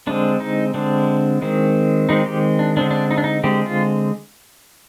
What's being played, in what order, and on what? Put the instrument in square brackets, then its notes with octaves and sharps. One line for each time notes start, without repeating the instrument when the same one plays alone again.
[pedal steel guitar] D3 G#3 C4 D4
D#4
D3 G#3 C4 D4
D#3 G#3 C4
D#3 G#3 C4 D#4
G4
D4
D3 G#3 C4 D4
D4
D#4
D4
D#4
D3 G#3 C4 G4
F4